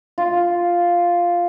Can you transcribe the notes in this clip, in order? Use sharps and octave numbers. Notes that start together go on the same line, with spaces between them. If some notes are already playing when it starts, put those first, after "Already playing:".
F4